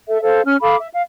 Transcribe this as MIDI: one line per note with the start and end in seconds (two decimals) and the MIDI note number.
0.08 0.21 69
0.08 0.21 76
0.23 0.41 69
0.23 0.41 72
0.23 0.41 77
0.45 0.57 61
0.45 0.57 89
0.61 0.76 69
0.61 0.76 77
0.61 0.76 83
0.61 0.76 86
0.80 0.88 76
0.93 1.02 77